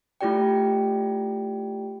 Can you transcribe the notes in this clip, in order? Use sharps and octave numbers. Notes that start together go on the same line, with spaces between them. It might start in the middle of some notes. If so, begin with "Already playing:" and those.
A3 E4 F4 G4 D5 G5